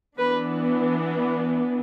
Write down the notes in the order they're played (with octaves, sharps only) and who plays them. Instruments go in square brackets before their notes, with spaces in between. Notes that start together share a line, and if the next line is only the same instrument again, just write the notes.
[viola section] E3 B3 D4 B4